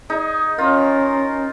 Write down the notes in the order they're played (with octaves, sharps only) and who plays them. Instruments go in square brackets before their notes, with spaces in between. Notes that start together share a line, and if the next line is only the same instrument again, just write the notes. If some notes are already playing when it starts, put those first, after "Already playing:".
[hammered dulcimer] D#4 [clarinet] G#4
[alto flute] C#4 [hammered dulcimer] F4 [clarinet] A#4